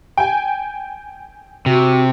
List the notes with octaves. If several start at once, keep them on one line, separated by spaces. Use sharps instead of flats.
G5 G#5
C3 F#4